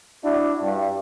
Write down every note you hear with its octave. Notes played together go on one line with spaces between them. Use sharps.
D4 E4 F#4
G2